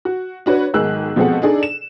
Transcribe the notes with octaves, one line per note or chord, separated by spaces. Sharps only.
F#4
D4 F#4 B4 C#5
B1 G#2 D#3 G#4 E6 F#6
B2 F3 G#3 C4 A4 F#5
D4 D#4 G#4 A4 D5
E7